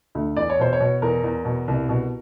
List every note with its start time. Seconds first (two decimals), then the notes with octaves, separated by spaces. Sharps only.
0.15 D2
0.37 E2 D5
0.50 C#5
0.59 B2 C5
0.73 C#5
0.80 B2
1.02 E2 A#4
1.24 E2
1.45 B2
1.68 C2
1.89 B2